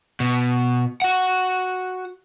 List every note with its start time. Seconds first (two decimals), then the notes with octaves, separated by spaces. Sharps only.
0.20 B2
1.02 F#4 F#5